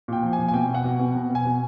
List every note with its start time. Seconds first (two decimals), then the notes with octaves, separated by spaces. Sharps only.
0.08 A#2 G5
0.23 F3
0.33 G#5
0.38 A#2
0.48 G#5
0.54 B2 G5
0.69 B2
0.74 F#5
0.84 B2
0.99 B2
1.15 B2
1.30 B2
1.35 G#5
1.45 B2